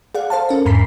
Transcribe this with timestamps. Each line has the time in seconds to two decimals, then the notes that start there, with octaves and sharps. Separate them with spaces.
0.15 G#4 D5 F5 F#5
0.30 A4 C5 F5 A5
0.49 C#4 A#4
0.66 E2 G#2 A#5 B5 B6 C7